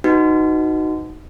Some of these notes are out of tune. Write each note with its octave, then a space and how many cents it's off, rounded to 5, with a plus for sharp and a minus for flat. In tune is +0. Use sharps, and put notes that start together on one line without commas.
D#4 +0 F#4 +0 B4 +30